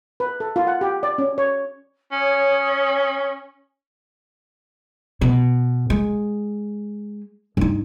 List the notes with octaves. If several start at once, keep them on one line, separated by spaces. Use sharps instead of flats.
B4
A4
F4
F#5
G4
D5
C#4
C#5
C#4 C#5 D#6
B2
G#3
G2 D#4